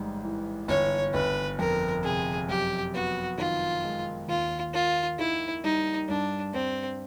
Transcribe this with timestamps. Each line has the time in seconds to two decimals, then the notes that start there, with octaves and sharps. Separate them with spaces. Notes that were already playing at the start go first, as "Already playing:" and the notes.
Already playing: A1 G#2 G3
0.24 E3
0.68 G1 C#5
1.14 G1 B4
1.59 F2 A#4
2.03 C3 G#4
2.48 F#2 G4
2.94 B3 F#4
3.38 D#3 F4
3.84 G#3
4.28 D#2 F4
4.74 A#3 F4
5.19 D#3 E4
5.64 G3 D#4
6.09 G2 D4
6.53 G2 C4